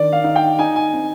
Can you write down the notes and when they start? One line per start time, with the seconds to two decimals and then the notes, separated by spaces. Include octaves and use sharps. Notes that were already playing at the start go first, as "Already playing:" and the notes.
Already playing: D#3 D4 D5
0.12 F5
0.24 D#4 F5
0.36 G5
0.59 D#4 G#5
0.76 G#5
0.94 C4